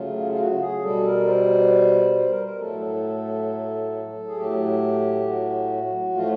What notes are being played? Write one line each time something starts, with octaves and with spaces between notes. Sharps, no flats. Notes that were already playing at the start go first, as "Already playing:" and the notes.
Already playing: C#3 F#3 A3 F4
F4
F#4
G#4
B2 G3 A4
A#4
C5
C5
A#4
A#4
A2 F#3 A3 A4
G#4
A2 F#3 A3 G4
F#4
A2 F3 A3 F4